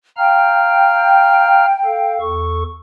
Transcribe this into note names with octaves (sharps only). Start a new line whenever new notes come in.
F5 G5 A#5 F6
A4 F5
E2 A4 C#6